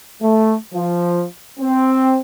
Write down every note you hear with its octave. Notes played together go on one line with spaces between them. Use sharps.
A3
F3
C4